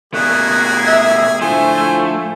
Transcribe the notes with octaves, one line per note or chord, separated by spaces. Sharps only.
B2 G3 A3 A#3 G#4 F#6
E5
A2 D3 F3 A3 C5 G#5